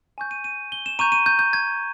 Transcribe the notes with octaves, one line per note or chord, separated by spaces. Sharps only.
G#5 C#6 G6
D#7
D#7
G7
E7
A#5 C#6 G6 D#7
D#7
G6
G6
G#6